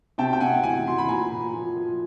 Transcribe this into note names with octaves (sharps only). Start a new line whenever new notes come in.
C3 G5 A5
G5
C3 F#5 G#5
E3 F#5 G#5
E3 C6
B5
A#2 G#5 A#5
A#2
F3
F3